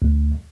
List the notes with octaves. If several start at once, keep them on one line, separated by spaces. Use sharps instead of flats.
D2